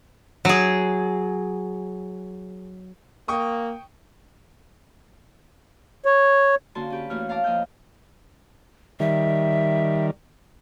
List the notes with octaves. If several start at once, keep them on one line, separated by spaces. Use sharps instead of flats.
F#3 G#4
A#3 G5 C#6 D#6
C#5
D3 A#3 C#4 F#4 A5 C6
C#4 G4 B4
E2 A3 A#3 F#4 C#5 F6
F5 A5 A#5 D6
F2 A#3 D#5 E5 F6 G6
D#3 G3 E5